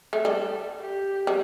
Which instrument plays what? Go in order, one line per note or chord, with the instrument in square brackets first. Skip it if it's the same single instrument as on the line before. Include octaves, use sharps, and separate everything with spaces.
[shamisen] A3
[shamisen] G3 [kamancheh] A4
[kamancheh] G4
[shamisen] G3